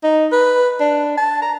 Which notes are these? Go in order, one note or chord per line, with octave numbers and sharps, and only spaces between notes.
D#4
B4
D4
A5
A#5